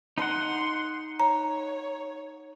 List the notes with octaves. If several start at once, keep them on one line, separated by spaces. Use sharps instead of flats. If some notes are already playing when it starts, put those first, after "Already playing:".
D#4 F#5 C6
C#5 A#5